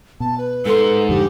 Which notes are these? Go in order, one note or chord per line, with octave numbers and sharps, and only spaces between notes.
B2 A5
B4
G#2 A4 C6
F2 D3 G4